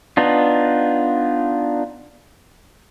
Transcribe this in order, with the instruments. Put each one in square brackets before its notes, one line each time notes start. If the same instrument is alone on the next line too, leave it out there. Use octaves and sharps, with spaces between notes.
[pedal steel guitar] B3 D4 D#4 F4